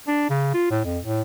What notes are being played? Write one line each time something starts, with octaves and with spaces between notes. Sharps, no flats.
D4
C#3
F4
A2
F2
A2